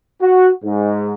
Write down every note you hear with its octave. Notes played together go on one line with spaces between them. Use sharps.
F#4
G#2